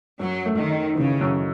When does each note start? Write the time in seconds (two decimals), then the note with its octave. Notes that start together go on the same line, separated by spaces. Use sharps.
0.19 F#2 F#3
0.46 A3
0.58 D#3
0.70 D#4
0.95 C#3 E3
1.21 F#2